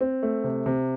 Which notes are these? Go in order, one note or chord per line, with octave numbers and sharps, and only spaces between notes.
C4
A3
C3
C3